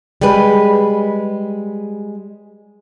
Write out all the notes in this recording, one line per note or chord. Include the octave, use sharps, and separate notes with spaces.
G3 G#3 G#4 B4